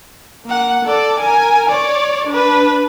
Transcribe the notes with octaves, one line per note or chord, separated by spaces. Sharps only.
A#3 F#5
A4 D5
A#4 G#5
C#5 D5
D4 B4